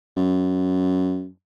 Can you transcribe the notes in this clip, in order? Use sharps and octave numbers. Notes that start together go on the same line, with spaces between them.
F#2